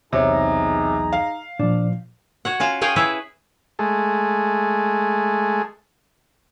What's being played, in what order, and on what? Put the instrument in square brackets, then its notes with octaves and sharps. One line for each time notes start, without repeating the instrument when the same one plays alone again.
[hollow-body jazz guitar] B1 E2 C#5 [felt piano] C3 [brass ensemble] D#4 G#4 A#5
[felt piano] F5
[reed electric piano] A#2 F3 [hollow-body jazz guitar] D4
[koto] F#4 C#5 F#5
C#4 F4 F#4 F5
G#4 C#5 F5 G5 G#5
E4 G#4 B4 C#5 E5
[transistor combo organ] G#3 A3